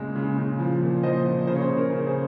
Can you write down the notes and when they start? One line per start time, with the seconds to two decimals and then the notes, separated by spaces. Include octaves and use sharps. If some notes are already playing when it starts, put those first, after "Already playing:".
Already playing: A#2 C#3 G#3
0.15 C#3
0.38 C#3
0.59 F3
0.82 A#2
1.03 F3 C5 D#5
1.26 A#2
1.47 C#3 C5
1.55 C#5
1.61 G#4 C5
1.70 C#3
1.77 A#4
1.92 C#3
2.07 G#4 C5